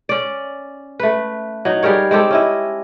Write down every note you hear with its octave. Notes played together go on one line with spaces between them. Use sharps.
C#4 D5
A3 B4
F#3 D#4
G3 G#4 A#4 C#5
G#3 C4 G4 A4
C#4 E4 D#5